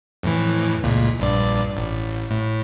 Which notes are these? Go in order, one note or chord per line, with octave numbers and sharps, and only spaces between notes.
F2 A2 E3
C#2 A#2
A#1 G2 D5
A1
A2